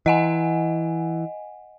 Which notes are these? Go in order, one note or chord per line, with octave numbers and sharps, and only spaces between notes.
E3 D#5 F#5 G#5